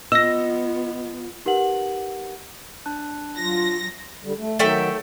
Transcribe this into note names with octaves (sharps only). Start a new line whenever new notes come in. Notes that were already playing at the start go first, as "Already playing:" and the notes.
B3 F4 D#5 E6 A#6
D#4 G4 A#4 B4 F#5 F#7
D4 A5 F#6
F#3 F4 A#6
D3 G3
A3
D#3 F#3 A3 E5 G5